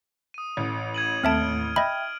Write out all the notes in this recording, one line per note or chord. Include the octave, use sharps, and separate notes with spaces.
D#6 D#7
A1
G#6 D#7 F#7
D#2 A3 C4 E5 A5 F6 G#6 D7
D#5 E5 G5 B5